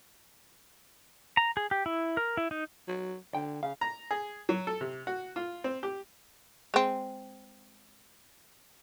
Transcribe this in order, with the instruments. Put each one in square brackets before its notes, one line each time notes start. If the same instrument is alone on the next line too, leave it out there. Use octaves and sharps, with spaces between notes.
[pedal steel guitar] A#5
G#4
G4
E4
A#4
E4
D#4
[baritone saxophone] F#3
[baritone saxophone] D3 [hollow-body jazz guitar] G5
[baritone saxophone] C#3 [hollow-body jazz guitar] F5
[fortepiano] A#5
G#4
F#3
A4
C3
F#4
F4
C4
G4
[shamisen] G#3 C4